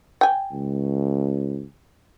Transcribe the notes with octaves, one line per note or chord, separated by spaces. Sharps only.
G5 G#5
C#2